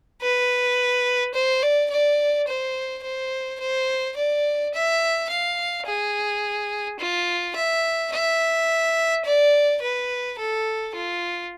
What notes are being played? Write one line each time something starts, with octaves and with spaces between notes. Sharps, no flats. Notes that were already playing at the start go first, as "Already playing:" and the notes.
B4
C5
D5
D5
C5
C5
C5
D5
E5
F5
G#4
F4
E5
E5
D5
B4
A4
F4